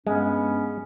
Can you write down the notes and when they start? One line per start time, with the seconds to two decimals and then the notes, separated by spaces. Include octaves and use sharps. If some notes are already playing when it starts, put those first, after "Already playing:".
0.07 G2 G#3 B3 C#4